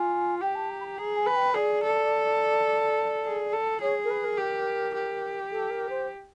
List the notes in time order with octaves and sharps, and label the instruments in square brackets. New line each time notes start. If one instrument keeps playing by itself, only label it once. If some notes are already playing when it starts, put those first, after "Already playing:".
Already playing: [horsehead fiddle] F4 [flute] G#5
[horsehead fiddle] G4 [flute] G5
[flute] A5
A#5
B5
A#5
[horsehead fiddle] G#4 [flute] A#5
[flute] G#5
[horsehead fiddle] B4
[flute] G5
[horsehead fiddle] G#4 [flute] D5
[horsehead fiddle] A4
G#4
A4
[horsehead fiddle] G#4 [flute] C#5
[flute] A#4
B4
A#4
[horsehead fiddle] G4
G4
[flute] A4
A#4
C5